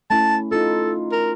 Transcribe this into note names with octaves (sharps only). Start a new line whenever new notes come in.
A3 C#4 E4 A5
D#4 F4 A4
A#4